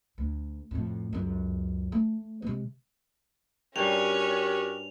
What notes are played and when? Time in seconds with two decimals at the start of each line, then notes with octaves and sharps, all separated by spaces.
0.18 D2
0.71 F2 A2
1.13 C#2 F#2
1.92 A3
2.42 C3 G#3
3.76 G2 G3 C#4 F#4 G4 A#4 C#5 F7